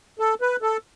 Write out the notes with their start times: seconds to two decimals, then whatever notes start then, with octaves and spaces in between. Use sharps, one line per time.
0.19 A4
0.41 B4
0.62 A4